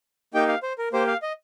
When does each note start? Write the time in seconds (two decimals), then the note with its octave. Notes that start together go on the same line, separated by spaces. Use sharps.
0.34 A#3 D#4 G4 G5
0.48 F5
0.63 C5
0.78 A#4
0.93 A#3 G4 C5
1.07 F5
1.22 D#5